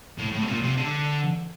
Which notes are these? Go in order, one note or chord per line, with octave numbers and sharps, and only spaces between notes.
A2
A2
C3
A#2
C3
D3